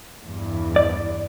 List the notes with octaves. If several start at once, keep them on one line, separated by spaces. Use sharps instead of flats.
E2 G2
D5